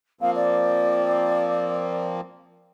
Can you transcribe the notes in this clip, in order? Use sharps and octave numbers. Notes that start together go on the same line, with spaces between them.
F3 A#3 C4 F5
D5